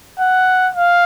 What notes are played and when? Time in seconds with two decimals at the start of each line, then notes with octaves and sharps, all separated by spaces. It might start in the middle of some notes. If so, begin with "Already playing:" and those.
0.20 F#5
0.75 F5